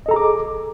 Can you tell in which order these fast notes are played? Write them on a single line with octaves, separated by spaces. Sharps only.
D#5 A4 A#5 G#4 D6